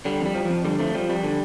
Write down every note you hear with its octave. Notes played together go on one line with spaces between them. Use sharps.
D3 G3
F2 G3
F3
F3
F2
D3 G3
F2 F3 A3
F3 G3
F2 G3
D3